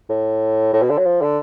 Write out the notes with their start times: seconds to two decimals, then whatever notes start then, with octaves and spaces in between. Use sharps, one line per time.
0.09 A2
0.73 A2
0.82 B2
0.89 D3
0.98 F#3
1.05 F3
1.22 D3